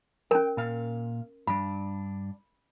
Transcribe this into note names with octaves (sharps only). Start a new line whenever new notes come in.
C#4 A#4 G5
A#2 F5
G2 D4 B5